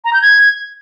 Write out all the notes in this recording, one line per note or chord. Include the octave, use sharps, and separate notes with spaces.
A#5
G6
G#6